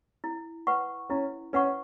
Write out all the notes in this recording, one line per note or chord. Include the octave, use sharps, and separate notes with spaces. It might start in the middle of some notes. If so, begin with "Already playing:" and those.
E4
B4 F#5 C#6
C#4 E4
C#4 B4 F#5 C#6